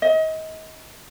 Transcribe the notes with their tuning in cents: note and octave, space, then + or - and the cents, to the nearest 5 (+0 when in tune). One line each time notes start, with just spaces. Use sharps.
D#5 +30